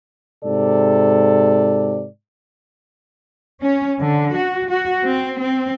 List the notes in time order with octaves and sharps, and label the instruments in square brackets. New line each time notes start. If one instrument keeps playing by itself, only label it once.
[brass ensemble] G#2 C3 A4 D5
[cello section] C#4
D3
F#4
F#4
C4
C4